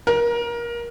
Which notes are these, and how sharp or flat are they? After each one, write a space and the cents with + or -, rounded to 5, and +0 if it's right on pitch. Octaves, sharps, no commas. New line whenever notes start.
A#4 +20